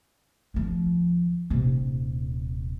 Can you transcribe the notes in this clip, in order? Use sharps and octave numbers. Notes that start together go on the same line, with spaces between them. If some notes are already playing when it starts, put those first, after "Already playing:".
D2 F3
D#1 C3